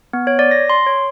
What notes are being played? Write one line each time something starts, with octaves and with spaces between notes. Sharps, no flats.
B3
C#5
D5
A#6
C6
C#5